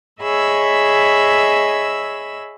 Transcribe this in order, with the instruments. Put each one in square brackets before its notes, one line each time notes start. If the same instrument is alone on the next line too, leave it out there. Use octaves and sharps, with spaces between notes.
[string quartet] G#4 C#5 D#5 E5 B5 E6